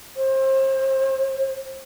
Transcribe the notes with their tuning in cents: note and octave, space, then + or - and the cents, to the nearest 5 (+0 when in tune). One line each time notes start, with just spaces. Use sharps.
C5 +30